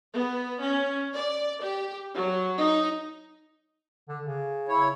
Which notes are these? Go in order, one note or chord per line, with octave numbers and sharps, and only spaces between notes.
B3
C#4
D5
G4
F#3
D#4
D3
C#3
E4 C#5